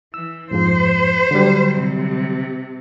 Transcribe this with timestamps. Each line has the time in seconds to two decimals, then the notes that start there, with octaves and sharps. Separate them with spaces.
0.14 E3 E6
0.51 F2 G#2 F3 C5
1.31 D3 F#3 G3
1.75 C3